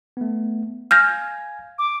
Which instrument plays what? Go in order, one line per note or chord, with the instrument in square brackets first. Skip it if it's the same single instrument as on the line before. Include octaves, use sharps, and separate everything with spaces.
[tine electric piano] A3 B3
[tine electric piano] F5 G#5 G#6 [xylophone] F6 G6 A#6
[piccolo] D6